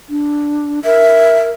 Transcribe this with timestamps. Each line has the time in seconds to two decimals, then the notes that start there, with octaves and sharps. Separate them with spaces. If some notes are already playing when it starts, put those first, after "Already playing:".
0.10 D4
0.85 A#4 E5